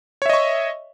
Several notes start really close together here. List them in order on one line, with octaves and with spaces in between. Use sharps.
C#5 E5 D#5 C#6